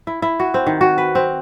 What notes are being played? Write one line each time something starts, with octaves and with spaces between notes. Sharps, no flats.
E4
E4
F#4
C4
D#3
F#4
B4
C4